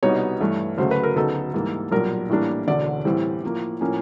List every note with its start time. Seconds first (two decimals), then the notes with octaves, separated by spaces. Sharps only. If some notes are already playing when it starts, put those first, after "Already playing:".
0.03 C2 B2 G3 B3 D#4 C#5
0.41 G2 E3 A3
0.78 D2 C#3 F#3 A3 C5
0.91 B4
1.03 A#4
1.16 D2 C#3 F#3 B3 D#4 A4
1.54 G#2 E3 G3 A#3
1.91 B1 A#2 G3 A#4
2.29 A2 E3 G3 A#3 D4
2.67 E1 D2 D3 D5
3.05 A2 E3 G3 C4
3.43 A2 F3 A#3
3.81 A2 F3 A#3 C#4